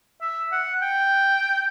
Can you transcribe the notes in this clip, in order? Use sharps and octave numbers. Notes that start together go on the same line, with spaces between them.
E5
F#5
G5